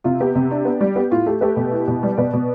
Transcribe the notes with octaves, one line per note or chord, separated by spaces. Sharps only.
C3 F4
B3 G4
C3
D4
B3
G3
B3 G4
A2 F4
A3 G4
A3 G4 B4
B2
E4
B2
G3
B2 B4 D5
B2